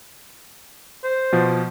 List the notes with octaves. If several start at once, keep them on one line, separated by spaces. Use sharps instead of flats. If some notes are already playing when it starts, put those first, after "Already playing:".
C5
B2 F3